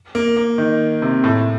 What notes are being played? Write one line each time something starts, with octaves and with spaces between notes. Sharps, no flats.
A#3
A#3
D#3
C3
A2